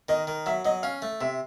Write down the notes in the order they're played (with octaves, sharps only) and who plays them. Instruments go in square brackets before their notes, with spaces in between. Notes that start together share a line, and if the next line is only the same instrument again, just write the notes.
[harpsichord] D#3 [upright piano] D#5
[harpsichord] D#3
[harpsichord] F#3 [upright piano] E5
[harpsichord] F#3 [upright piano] D#5
[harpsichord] C#4 [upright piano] F5
[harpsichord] A3
[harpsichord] C3 [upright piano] E5